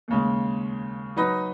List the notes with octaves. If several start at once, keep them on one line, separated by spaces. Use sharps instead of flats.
D#2 C#3 G#3
F#3 D#4 B4 D#5